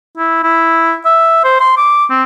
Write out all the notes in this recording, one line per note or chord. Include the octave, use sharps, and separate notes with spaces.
E4
E4
E5
C5
C6
D6
C4